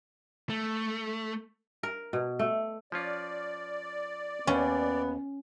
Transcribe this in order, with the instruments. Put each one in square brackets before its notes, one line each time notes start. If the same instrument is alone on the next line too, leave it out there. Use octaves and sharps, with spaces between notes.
[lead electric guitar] A3
[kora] A#4
B2
A3
[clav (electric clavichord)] F3 C#4 F4 [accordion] D5
[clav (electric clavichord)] D#2 [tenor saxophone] B3 [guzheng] C#4